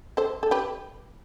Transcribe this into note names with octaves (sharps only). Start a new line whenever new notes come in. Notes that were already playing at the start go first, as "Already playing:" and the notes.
A4 C5
A4
G4 B4